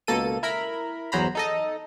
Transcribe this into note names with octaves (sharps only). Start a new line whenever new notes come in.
C#2 B2 A#3 A4 D#7
E4 A#4 B5
G1 E2 F#3 C5 A#5 B5
D#4 A4 D#5